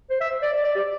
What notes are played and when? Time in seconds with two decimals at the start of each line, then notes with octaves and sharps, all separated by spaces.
0.10 C5
0.21 E5
0.43 D5
0.53 D5
0.64 D5
0.75 G4